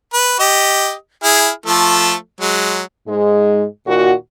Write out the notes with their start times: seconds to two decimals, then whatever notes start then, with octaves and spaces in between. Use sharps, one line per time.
0.13 B4
0.40 G4 D#5
1.24 E4 G#4 F6
1.66 F3 A3 A4
2.41 F#3 G#3
3.07 G#2 G#3
3.86 D#2 A#2 F#4